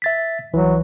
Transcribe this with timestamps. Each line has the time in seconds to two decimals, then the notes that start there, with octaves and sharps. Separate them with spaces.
0.02 E5 A6 B6
0.53 C2 E3 F#3